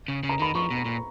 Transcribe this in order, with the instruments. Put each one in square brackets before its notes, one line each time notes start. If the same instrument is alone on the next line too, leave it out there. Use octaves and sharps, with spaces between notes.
[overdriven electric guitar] C#3
C#3
[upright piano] A#5
[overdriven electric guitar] D#3 [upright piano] B5
[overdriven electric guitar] F3 [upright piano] C#6
[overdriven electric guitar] B2
A#2